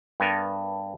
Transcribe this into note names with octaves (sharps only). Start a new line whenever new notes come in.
G2 B3 A4 A#4 G#5